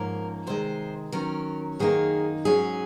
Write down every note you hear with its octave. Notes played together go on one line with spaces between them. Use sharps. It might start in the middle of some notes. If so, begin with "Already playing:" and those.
Already playing: G#2 F3 A#3 C#4 A#4
C3 D#3 G#3 C5
D#3 F#3 C#4 A#4
F#2 D#3 A#3 D#4 G#4
G#2 F#3 C#4 G#4